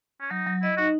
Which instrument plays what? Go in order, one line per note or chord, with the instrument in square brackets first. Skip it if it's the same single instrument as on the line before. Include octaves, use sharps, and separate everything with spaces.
[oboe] C#4
[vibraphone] F#3 [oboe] D#4
[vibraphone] F#3
[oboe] E4 [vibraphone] D#5
[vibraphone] D#4 [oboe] F#4